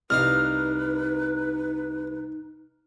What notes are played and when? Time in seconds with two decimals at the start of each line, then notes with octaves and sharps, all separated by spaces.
0.10 C2 D#4 B4 D#5 F5 F6